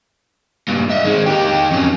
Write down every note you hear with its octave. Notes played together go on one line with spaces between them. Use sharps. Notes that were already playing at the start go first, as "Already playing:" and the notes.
G2 A#2
D#5 E5
D#3 G#3
D#4 G4
F2 C#4